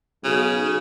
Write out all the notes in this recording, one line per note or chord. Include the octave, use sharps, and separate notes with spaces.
B1 C#3